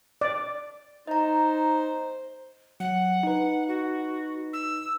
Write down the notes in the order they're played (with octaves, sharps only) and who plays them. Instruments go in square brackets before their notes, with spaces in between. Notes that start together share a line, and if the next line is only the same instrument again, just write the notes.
[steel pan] D5
[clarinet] D#4 [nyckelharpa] C5 [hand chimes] D#5 A#5
[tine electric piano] F#3 [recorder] F#5
[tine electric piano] D#4 B4
[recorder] F#4
E6